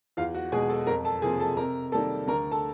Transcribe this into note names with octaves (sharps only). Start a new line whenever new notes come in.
E2 F4 F5
F#4 F#5
B2 G#3 G#4 G#5
A4 A5
F2 A#4 A#5
A4 A5
C3 F3 A#3 G#4 G#5
A4 A5
C3 A#4 A#5
D#3 G3 A#3 A4 A5
D2 A#4 A#5
A4 A5